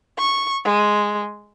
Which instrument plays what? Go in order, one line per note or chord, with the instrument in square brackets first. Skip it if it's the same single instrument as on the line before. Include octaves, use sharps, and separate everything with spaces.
[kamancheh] C#6
G#3